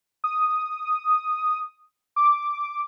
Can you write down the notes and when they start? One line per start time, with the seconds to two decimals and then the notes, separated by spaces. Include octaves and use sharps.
0.24 D#6
2.16 D6